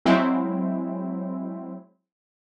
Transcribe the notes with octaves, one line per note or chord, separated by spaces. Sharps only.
F#3 G#3 C4 E4